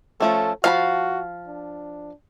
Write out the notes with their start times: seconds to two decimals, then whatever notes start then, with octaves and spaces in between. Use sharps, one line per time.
0.20 F3 A3 C#4 A4
0.64 F3 F#4 F5 A5 B5
1.47 D4